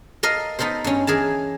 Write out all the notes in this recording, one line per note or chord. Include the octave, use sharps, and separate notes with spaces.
A4 A#4 D#5 F5
B3 D#4 A4 A#4 C5
G2 C#4
E3 G#4 A#4 A5